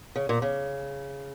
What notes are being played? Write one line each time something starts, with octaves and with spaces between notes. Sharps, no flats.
C#3
A#2
C#3